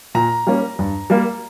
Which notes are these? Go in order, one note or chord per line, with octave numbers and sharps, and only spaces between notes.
A#2 A#5
G3 A#3 C#4
G2
G3 A#3